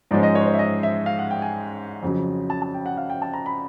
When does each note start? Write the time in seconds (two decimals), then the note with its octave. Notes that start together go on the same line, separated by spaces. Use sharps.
0.11 G#2 F3 G#3 C#4 D5
0.23 D#5
0.35 C#5
0.41 C5
0.47 C#5
0.54 E5
0.59 D#5
0.83 E5
1.06 F5
1.19 F#5
1.31 G5
1.42 G#5
2.02 F2 C#3 F#3
2.50 A5
2.62 A5
2.74 G5
2.86 F#5
2.97 F5
3.10 G5
3.22 A5
3.34 A#5
3.46 B5